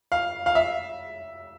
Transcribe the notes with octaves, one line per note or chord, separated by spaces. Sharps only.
F5
F5
E5